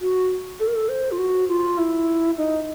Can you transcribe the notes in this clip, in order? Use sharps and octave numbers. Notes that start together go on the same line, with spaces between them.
F#4
A4
A#4
A4
C5
F4
F#4
F4
E4
D#4